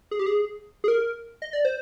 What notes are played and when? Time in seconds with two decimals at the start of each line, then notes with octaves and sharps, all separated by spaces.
0.11 G#4
0.19 G4
0.26 G#4
0.84 G#4
0.88 A#4
1.42 D#5
1.53 D5
1.65 C5